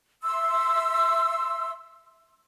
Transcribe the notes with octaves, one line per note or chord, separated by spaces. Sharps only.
E5 C6 E6